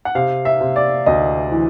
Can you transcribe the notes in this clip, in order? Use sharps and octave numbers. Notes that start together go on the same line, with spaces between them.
F#5
C3 F5
E5
C3
D5
D2 D#5
E3